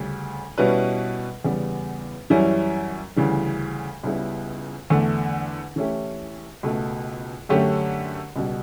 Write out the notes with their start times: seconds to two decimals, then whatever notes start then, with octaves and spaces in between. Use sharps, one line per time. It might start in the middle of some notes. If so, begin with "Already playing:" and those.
Already playing: D2 C#3 G3
0.58 B2 G3 C#4 E4 B4
1.45 E2 C#3 G3 B3
2.30 F#2 E3 G3 C#4 E4
3.16 D2 C#3 E3 G3
4.03 C#2 C#3 G3 B3 E4
4.90 E2 D3 A3
5.76 E3 A3 C#4 E4 G4
6.63 C#2 B2 A3
7.49 F#2 D3 A3 C#4 G4
8.36 C#2 B2 G3